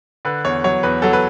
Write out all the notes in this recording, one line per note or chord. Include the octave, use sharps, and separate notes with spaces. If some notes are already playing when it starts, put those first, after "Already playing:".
D3 B4
E2 C#5
F#3 C#5
E2 B4
F#3 A4
B4